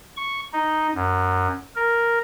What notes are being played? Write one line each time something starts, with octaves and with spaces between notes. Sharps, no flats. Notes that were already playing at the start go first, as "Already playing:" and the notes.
C#6
D#4
F#2
A#4